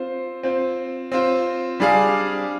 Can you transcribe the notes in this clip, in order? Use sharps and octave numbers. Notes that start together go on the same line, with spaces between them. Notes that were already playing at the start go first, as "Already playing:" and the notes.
Already playing: C4 F4 C5
C4 F4 C5
C4 F4 C5
G3 D4 G#4 D5 F5